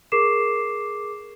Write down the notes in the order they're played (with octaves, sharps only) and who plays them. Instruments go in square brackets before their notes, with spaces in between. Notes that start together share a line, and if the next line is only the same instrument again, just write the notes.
[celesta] G#4 A#4 C#6 D6 C7 E7